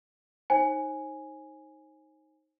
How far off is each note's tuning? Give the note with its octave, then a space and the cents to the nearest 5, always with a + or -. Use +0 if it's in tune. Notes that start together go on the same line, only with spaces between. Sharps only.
D#4 +10 C5 +40 G#5 +0